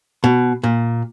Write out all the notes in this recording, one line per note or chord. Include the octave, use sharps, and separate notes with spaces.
B2
A#2